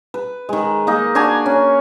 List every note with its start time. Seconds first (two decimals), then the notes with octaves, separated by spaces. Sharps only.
0.14 B4
0.49 D#3 G#3
0.87 A#3 D#4 D#5
1.15 D4 F#4 G#5 A#5
1.46 C#4